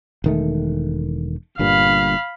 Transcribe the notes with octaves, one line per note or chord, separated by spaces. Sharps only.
E1 D#3 A3
G1 G2 A#2 F5 B5